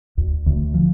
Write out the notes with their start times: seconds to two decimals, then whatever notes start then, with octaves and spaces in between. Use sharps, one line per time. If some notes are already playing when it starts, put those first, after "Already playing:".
0.18 D2
0.46 D2
0.74 F3